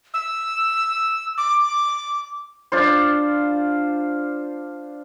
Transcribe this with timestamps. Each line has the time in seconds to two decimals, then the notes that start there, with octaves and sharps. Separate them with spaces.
0.14 E6
1.37 D6
2.72 D4 F4 C5